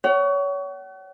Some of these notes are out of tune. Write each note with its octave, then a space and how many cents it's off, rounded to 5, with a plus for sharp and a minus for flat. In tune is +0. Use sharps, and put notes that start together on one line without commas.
C#5 +30 F#5 +40